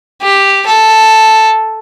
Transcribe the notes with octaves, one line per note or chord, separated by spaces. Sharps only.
G4
A4